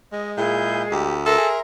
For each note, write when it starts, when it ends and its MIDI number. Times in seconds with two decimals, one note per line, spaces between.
0.12 1.05 56
0.12 0.31 75
0.37 0.85 46
0.37 0.82 64
0.37 0.92 68
0.37 0.82 91
0.92 1.33 38
0.92 1.14 67
1.26 1.48 69
1.26 1.58 70
1.26 1.60 76
1.26 1.60 82
1.26 1.60 84
1.38 1.59 68